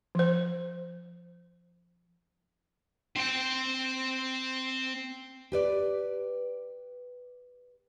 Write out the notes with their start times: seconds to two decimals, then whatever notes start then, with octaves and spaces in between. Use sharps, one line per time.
0.15 F3 C5
3.16 C4 G5
5.52 G4 B4 D5